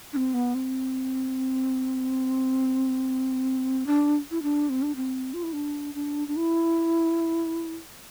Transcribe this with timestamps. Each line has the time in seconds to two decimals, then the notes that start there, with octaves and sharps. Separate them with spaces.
0.13 D4
0.16 C4
0.34 B3
0.55 C4
3.86 D4
4.31 E4
4.43 D4
4.69 C4
4.82 D4
4.96 C4
5.34 F4
5.43 E4
5.53 D4
5.94 D4
6.28 D4
6.36 E4